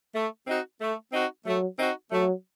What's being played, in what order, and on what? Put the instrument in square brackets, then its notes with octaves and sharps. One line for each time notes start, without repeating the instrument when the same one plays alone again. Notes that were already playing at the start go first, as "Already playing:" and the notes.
[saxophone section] A3
C4 D#4 F#4
A3
C4 D#4 F#4
[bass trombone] F#3 [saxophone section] A3
[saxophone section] C4 D#4 F#4
[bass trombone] F#3 [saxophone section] A3